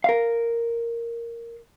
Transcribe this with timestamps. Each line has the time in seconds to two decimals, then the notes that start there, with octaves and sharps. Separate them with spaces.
0.04 A#4 F5